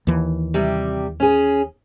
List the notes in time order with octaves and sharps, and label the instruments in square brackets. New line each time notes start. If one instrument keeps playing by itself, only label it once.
[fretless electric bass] D#2 E3
[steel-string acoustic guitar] C3 G3
C#4 G#4